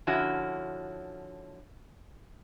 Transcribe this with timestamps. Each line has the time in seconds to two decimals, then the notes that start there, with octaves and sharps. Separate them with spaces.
0.07 D3 F3 C#4 E4 F#4